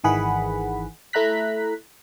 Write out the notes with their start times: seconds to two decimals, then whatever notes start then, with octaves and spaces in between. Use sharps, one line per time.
0.04 G#1 D#3 E3 G#4 F#5 B5
1.13 A3 E4 A#5 F#6 B6